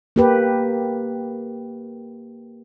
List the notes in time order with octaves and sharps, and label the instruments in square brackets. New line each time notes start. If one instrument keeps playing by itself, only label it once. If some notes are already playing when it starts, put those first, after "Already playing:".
[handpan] A#3 G4 B4